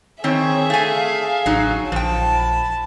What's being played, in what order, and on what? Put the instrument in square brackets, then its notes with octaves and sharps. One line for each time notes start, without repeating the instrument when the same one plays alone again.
[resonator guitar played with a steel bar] D#3 C4 [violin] G#4 E5 [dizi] C#5
[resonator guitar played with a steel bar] A3 G#5 [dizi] F5
[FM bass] A1 [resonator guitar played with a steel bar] F#3 D#4
[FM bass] A#1 [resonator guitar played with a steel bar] F3 G5 [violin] A5
[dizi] B5